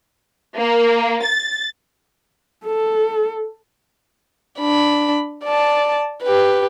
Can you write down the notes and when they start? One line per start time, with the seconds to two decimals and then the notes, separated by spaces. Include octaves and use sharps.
0.57 A#3
1.24 A6
2.66 A4
4.59 D4 B5
5.44 D5 A5
6.23 G4 B4